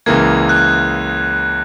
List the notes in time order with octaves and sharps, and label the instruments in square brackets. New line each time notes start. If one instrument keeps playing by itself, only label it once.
[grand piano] C#2 C#3 E3 A#3 [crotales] G#6
[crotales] F#6